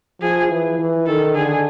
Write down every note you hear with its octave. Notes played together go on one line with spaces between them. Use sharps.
F3 G#4
E3
E3
D#3 A4
D3 G#4